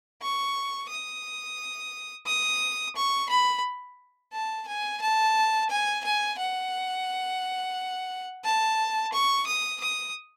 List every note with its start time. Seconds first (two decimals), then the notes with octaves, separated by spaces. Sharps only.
0.22 C#6
0.89 D#6
2.27 D#6
2.96 C#6
3.29 B5
4.33 A5
4.67 G#5
5.02 A5
5.70 G#5
6.04 G#5
6.39 F#5
8.44 A5
9.13 C#6
9.47 D#6
9.81 D#6